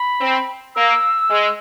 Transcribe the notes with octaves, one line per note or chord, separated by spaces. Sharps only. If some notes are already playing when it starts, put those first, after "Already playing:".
Already playing: B5
C4
A#3 E6
G#3